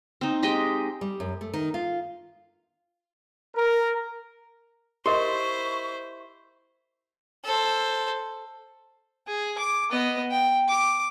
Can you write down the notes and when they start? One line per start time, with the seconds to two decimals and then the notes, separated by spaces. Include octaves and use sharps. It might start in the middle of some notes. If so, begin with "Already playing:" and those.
0.21 C4 D#4
0.43 G#3 G4 D#5 G5
1.01 G3
1.20 F#2
1.41 A3
1.54 D#3
1.74 F4
3.55 A#4
5.06 E4 G4 A#4 C5 D#5 C6 C#6
7.45 A4 C5
9.27 G#4
9.58 D6
9.91 B3 D#5
10.31 G5
10.68 D6